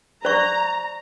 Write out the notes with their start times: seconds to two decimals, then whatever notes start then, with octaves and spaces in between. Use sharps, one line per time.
0.25 C5 D5 A#5 C#6